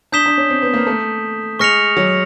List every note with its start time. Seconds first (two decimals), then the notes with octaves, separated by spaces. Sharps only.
0.12 D4 D#6 G6 B6 E7 G7
0.26 D4
0.37 C#4
0.50 C4
0.62 B3
0.74 A#3
0.87 A3
1.59 G#3 C#6 F6 A#6 C#7 F7
1.97 F#3